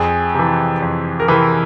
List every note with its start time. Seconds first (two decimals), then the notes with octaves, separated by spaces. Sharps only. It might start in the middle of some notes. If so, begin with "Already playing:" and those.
Already playing: F2 G#4
0.35 C3 E3
0.82 F2
1.20 A#4
1.28 C3 E3 B4